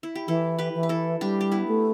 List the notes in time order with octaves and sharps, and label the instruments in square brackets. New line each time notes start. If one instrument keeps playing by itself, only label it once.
[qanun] E4
G4
[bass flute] E3 [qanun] E4 A4
[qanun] G4 B4
[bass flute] E3
[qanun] B4
E4 A4
[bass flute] G3 [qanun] D4 G4
[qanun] G4
B3 E4
[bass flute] A3